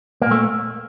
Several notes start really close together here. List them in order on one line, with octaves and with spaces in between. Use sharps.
A#3 A#2 A3